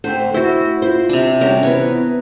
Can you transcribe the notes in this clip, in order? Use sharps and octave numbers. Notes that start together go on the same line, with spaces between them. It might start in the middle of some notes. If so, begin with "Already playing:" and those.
D3 A3 C4 C5
E4 F#4 C5
E4 F4 C5
C3 D4
G3 C#4 F#4 A#4
E3 B3 B4 C#5